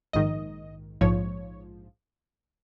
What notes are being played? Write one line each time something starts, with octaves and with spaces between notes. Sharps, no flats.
A#1 G#2 D#3 D#5
A#1 G#2 F3 C#5